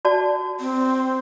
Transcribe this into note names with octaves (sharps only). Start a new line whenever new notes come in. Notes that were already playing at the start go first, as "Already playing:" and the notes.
F#4 D5 A5
C4